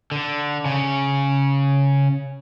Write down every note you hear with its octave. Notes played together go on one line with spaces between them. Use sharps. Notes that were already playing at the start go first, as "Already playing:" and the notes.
D3
C#3